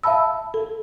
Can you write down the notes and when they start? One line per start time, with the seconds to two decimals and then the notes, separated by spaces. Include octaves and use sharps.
0.04 E5 F5 A5 B5 E6
0.54 A4